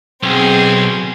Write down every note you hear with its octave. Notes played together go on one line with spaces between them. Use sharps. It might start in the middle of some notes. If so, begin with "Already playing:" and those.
B1 C4 G#4